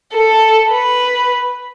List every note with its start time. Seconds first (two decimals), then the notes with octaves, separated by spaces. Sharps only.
0.14 A4
0.71 B4